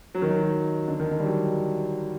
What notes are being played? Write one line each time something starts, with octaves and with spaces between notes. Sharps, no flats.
F#3
D#3
F#3
D3
D#3
D3
G3
F#3